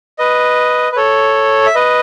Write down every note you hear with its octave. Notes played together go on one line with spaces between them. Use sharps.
B4 D#5
B4
A4 C#5
E5
B4 D#5